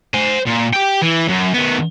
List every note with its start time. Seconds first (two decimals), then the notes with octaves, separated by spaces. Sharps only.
0.14 C5 G#5
0.46 A#2
0.73 G4 G5
1.02 E3
1.28 F#2
1.54 D#3 B3